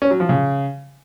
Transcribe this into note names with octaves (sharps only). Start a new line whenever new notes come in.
C#4
F#3
F3
C#3